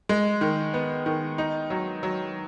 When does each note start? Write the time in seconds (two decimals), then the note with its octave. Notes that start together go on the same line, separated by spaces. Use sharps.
0.09 G#3
0.41 D#3
0.74 B3
1.06 D#3
1.38 D#4
1.70 F#3
2.03 F#3